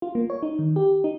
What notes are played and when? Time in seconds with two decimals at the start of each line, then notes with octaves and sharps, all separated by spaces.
0.02 F4
0.15 A#3
0.30 C#5
0.43 D#4
0.59 D#3
0.76 G4
1.04 D#4